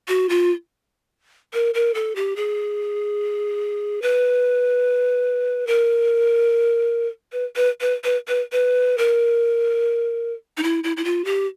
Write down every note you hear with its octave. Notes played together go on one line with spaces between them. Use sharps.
F#4
F4
A#4
A#4
A4
G4
G#4
B4
A#4
B4
B4
B4
B4
B4
B4
A#4
D#4
E4
E4
E4
F4
G4